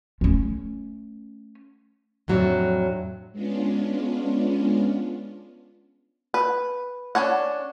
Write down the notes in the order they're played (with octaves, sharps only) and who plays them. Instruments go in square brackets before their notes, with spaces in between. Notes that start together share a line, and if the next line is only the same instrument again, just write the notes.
[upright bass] A3 C#4
[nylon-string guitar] F2 A2 F#3 C4 D4
[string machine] G#3 B3 C#4 D4 F4
[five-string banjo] B4
C#4 D4 C#5 F#5